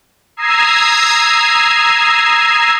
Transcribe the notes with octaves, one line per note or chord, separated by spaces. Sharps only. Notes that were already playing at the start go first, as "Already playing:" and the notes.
A#5 D#6 E6 G#6 C7